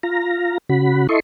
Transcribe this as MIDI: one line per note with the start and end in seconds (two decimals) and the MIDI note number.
0.03 0.58 65
0.03 0.58 82
0.69 1.07 49
0.69 1.07 66
0.69 1.07 83
1.09 1.20 64
1.09 1.20 69
1.09 1.20 75
1.09 1.20 84
1.09 1.20 85